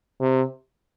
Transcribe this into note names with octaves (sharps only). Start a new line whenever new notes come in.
C3